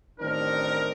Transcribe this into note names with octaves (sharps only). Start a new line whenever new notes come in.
A1 D#3 C4 D4 D#4 A#4